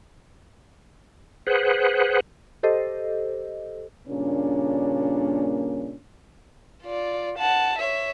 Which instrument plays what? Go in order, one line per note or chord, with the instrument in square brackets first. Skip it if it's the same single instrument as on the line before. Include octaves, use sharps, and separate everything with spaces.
[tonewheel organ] G#4 B4 C5 F#5
[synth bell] G4 A4 C5 D#5
[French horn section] G2 A#2 C#3 A#3 C#4 D4
[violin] F4 D5
F#5 A5
C#5 E5